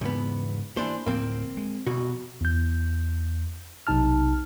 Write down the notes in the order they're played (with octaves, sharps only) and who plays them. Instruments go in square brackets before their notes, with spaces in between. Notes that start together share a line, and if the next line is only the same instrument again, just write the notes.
[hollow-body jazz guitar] E2 B3 [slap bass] G#2 C#3 F3
[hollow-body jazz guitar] E3 D4 C5 [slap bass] A#3
[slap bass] D1 A2 F3 [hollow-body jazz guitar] A#3 C4
[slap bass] G#3
[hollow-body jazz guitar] C2 F2 F#4 [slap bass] B2
[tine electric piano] E2 G6
B1 C3 D#4 A5 F6